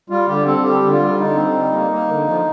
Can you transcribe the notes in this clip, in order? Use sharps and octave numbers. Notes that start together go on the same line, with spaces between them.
G3 F4
D3 G4
C4 A4
G3 G4
D3
F4
G3
D3 D#4
C4
G3
A#3
A#3
D3
F3